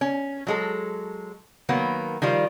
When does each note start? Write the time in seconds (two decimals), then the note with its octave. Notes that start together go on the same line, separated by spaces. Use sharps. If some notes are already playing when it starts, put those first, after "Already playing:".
0.01 C#4
0.47 F#3 G#3 A4
1.69 D#3 F#3 A#3 B3
2.22 D#3 F3 G3 F4